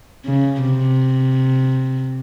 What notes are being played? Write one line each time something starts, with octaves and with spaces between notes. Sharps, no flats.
C#3
C3